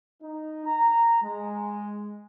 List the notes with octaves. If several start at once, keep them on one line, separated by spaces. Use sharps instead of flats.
D#4
A#5
G#3